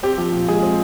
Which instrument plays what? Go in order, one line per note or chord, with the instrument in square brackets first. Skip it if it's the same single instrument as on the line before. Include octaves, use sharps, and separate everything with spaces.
[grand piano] C4 G4
F3
A#2
G#3 G#4
C4